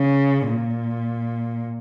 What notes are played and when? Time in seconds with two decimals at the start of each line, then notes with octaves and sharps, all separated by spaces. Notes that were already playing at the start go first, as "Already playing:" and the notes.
Already playing: C#3
0.48 A#2